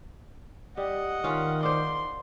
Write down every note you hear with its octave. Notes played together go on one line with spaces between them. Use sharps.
G3 D#5 F#5
D#3 C#4 F4
C5 D5 C6